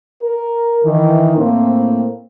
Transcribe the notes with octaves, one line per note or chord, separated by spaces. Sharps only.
A#4
D#3 E3
A2 A#3 C4